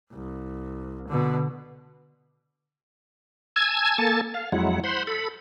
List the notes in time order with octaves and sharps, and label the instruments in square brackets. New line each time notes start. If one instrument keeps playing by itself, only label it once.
[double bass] C2
B2 D3
[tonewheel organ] G#5 A5 E6 G#6
A#3 A4 G#5 A5 A6
F5
F2 F#3 G#3 E4 F#5
C5 F#5 B5 C6
A4 B5